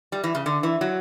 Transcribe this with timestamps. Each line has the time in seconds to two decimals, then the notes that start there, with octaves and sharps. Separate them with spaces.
0.12 G3
0.24 E3
0.35 C#3
0.46 D3
0.63 E3
0.81 F#3